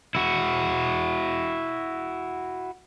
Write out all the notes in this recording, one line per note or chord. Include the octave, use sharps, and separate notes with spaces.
E4 F#4